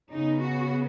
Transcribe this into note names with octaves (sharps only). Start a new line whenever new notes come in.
C#3 B3 D#4
F#4